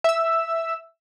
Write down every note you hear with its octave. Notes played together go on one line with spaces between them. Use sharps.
E5 E6